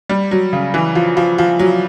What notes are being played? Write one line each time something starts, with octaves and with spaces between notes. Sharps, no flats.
G3
F#3
C#3
E3
F3
F3
F3
F#3